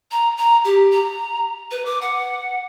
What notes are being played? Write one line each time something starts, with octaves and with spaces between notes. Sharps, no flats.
A#5
A#5
G4
A#5
B4
D6
F#5